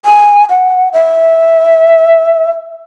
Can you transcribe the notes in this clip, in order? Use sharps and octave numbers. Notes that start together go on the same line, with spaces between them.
G#5
F#5
E5